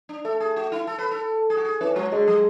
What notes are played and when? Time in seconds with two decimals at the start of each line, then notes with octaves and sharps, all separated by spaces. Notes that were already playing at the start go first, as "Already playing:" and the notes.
0.09 D4
0.25 A3 A4
0.40 G#4
0.56 F#4
0.72 E4
0.87 A4
0.99 B4
1.11 A4
1.50 G#4
1.57 F#4
1.65 G#4
1.81 E3 C#4
1.96 F#3 G#3
2.12 D3 G#3
2.28 F#3